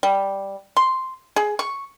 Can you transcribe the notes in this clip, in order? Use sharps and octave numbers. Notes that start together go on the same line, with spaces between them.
G3
C6
G#4
C#6